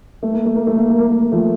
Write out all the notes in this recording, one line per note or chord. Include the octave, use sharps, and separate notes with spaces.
A3
A#3
A3
A#3
A3
A#3
A3
A#3
A3
A#3
F3 A3